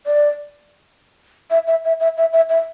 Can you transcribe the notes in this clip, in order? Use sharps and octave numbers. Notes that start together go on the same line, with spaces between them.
D5
E5
E5
E5
E5
E5
E5
E5